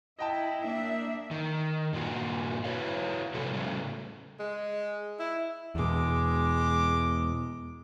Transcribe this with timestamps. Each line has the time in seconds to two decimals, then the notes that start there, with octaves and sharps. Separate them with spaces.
0.19 E4 D#5 G5 A5
0.62 A#3 D4 E5
1.31 D#3
1.93 G2 A#2 B3 F4 F#4
2.64 E4 F#4 B4 C#5 F5
3.34 A2 C3 F3 B3 F#4 A4
3.53 A2 C#3 G3
4.40 G#3
5.20 E4
5.75 E2 B2 G#3 D6